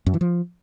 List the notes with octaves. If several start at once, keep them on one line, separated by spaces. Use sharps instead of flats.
F#2
E3
F3